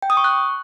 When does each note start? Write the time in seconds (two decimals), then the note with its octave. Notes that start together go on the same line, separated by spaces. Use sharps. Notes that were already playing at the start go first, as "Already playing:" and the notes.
0.02 G5
0.10 D#6
0.17 C#6
0.24 F#6